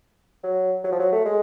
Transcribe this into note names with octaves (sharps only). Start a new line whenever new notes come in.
F#3
F#3
F3
F#3
A3
G#3